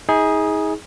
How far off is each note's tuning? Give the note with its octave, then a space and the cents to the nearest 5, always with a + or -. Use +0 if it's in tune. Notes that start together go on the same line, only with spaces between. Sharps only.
D#4 +40 G#4 +0